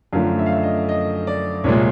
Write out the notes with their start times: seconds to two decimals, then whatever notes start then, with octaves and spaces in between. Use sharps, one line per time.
0.13 F#2 D3 F3 A3 F5
0.39 E5
0.46 F5
0.53 E5
0.63 D#5
0.89 D#5
1.27 D5
1.64 C2 A#2 F3 G#3 C#5